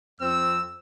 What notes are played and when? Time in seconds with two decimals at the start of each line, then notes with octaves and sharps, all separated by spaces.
0.21 F2 C4 E6